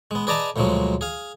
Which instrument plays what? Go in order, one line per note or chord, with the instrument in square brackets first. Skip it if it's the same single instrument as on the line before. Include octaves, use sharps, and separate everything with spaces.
[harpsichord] G#3 B3
G#4 B4 D5 D#5 A5 A#5
D2 B2 F3 F#3 G#3
G#4 F5